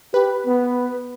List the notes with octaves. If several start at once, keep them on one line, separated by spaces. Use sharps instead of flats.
G4 B4
B3